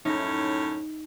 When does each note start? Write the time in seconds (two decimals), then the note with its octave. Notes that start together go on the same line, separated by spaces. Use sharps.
0.05 F#2 A2 C#4 D#4